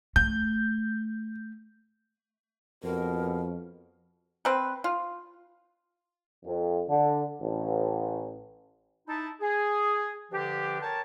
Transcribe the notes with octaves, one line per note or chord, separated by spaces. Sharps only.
A3 G6
F2 B2 A#4
C4 B4
F4
F2
D3
A1
D#4 E4 A5
G#4
G2 D3 F3 D4 G4
A#4 C#5 G5 A5